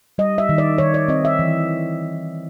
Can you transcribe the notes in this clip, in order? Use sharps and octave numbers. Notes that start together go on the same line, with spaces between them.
G3 D#5
E5
D#3
D5
D#3 C#5
D5
C4 D#5
E5
E3